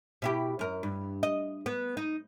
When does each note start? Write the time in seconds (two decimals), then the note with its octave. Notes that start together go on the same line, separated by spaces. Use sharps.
0.22 B2 E4 G4
0.59 F#2 A#4
0.83 G2
1.23 D#5
1.66 B3
1.97 D#4